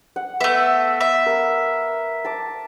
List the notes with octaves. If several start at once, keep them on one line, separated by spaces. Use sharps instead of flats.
F#5
A3 B3 E5
E5
A#4
A5 D6